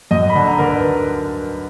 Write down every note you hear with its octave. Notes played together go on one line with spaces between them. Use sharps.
F#2 D#5
B5
D3
A#5
D3 A#4
B4